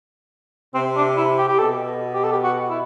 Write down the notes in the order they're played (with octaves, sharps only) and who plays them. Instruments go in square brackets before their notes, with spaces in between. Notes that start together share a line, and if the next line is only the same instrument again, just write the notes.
[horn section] C3 [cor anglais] C4
[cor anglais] D4
E4
G4
G4
[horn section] B2 [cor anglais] A4
[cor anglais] G4
A4
G4
F#4
E4